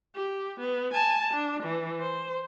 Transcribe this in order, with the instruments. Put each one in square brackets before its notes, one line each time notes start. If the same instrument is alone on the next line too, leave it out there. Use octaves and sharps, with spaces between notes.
[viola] G4
B3
G#5 A5
D4
E3
C5